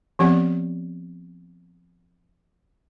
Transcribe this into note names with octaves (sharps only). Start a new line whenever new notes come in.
F3 B3 C4 G4 D5 F#5